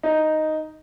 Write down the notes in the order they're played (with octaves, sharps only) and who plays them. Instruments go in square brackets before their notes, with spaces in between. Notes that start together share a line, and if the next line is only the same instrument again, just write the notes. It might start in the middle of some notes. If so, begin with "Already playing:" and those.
[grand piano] D#4